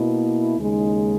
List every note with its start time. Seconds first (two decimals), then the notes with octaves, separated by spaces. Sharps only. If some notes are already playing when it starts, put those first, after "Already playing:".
Already playing: B2 A#3 E4
0.58 D#2 C#3 G#3 D#4